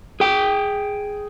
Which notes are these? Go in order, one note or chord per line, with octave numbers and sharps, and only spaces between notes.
G#4 G5